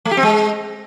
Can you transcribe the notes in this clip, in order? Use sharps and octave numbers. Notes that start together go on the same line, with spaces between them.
A3
G4
C4
G#3